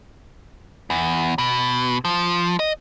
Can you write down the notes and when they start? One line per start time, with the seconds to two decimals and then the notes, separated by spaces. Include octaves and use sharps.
0.90 E2
1.38 B2
2.05 F3
2.60 D#5